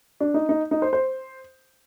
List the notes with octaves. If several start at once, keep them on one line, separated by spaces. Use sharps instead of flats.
D4
D#4
D#4
D#4
C5
C5